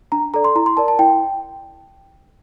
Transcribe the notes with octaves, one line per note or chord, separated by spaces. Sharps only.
D4 A#5
A4 D5 A#5
C6
E4 A#5
C6
A#4 D5 A5
A5
E4 G5